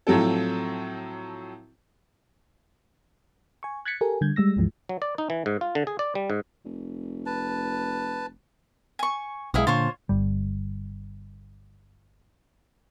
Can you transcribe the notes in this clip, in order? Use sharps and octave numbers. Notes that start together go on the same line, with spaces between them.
A2 F3 F#3 C4 A4
G#5 C#6
F#6 G#6 A6 B6 C#7
G4 A4 A#4 G#5
D3 G3 G6 G#6
G3 G#3 E6 A#6
C#2 G2 E3 F3 G#3
F#3
D5
D#4
E3
G#2
F4
D3
G#4
D5
G3
G#2
F1
B4 A5
G#5 C#6
B1 G#3 E4 F5 D#6
A#2 D3 F4 C5 C#5
G1 G3